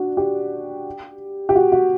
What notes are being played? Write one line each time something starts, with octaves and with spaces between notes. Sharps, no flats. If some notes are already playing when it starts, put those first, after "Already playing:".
Already playing: D4 F#4
G4
G4
F#4
F#4